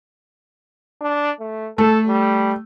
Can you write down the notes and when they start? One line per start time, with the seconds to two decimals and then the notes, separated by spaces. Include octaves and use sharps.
1.01 D4
1.40 A3
1.78 A3 A4
2.08 G3